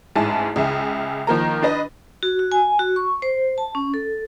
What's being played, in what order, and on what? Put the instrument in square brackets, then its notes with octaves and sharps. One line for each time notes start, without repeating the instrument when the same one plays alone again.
[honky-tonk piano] A1 G#2 E4 G#5 A5
C#2 C#3 E5 G#5
D#3 F3 A#3 A#5
D4 B4 D#5
[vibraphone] F#4
F#4
G#5
F#4
C#6
C5
A5
C#4
A4